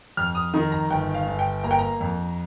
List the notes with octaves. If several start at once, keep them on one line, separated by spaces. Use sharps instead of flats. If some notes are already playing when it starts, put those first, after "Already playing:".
F2 F6
D#6
D#3 A#5
A#5
G1 G5
F5
G1
G5
A#3 A#5
G5
A#5
F2